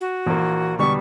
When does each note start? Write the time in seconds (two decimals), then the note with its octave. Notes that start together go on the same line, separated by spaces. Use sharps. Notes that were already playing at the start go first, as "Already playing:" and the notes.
0.01 F#4
0.26 A#1 E3 A#3
0.79 E2 B2 D3 G3 C#6